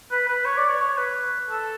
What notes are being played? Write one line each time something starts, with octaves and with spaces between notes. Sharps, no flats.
B4
B4
C#5
D5
C#5
C#5
B4
A4